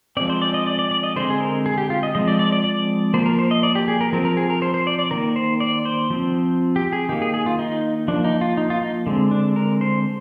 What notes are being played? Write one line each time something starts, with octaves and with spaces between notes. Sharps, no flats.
F3 G#3 C4 D5
C5
D5
D#5
D5
D5
D5
D#5
D3 G#3 C4 C5
G#4
A#4
G#4
G4
F4
D#5
F3 G#3 C4 D#5
D5
D5
D5
D5
F3 A#3 C5
A#4
C5
D#5
D5
G4
G#4
A#4
F3 C4 A#4
A#4
G#4
A#4
C5
C5
D5
D5
D#3 A#3 A#4
C5
D5
C5
F3 C4
G4
G#4
D#3 A#3 G4
G#4
G#4
F4
D#4
F3 A#3 D4
D#4
F4
D#4
F4
D#4
D3 G#3 C4
D4
A#4
C5